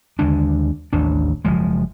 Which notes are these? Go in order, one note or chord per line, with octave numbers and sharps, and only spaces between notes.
D#2 D3 G#3 D4
A1 D#2 D4
F#1 F3 G#3